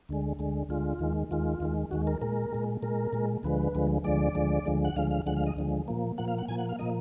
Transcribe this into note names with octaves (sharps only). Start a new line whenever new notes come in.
D2 D3 G#3
D2 D3 G#3
D2 D3 G#3 F4
D#2 D#3 G#3
D#2 D#3 G#3 F4
D#2 D#3 G#3
D#2 D#3 G#3 F#4
A#4
A#2 G#3 A#4
A#2 G#3
A#2 G#3 A#4
A#2 G#3
D2 D3 F3 G#3 B4
D2 D3 F3 G#3
D2 D3 F3 G#3 D5
D2 D3 F3 G#3
D2 D3 F3 G#3
F#5
D2 D3 F3 G#3 F5
F5
D2 D3 F3 G#3 F#5
F5
D#5
D2 D3 F3 G#3
A#2 F3 A#3
A#2 F3 A#3 F#5
F5
F#5
A#2 F3 A#3 G#5
F#5
F5
A#2 F3 A#3 D#5